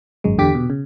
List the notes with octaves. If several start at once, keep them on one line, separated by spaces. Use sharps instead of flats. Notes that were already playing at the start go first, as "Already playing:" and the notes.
G#1 F#2 G#3
E2 D3 G4 D6 B6
B2
C#3